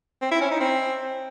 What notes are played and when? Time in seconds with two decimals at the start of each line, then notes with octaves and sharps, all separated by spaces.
0.22 C4
0.31 E4
0.41 C#4
0.51 D#4
0.61 C4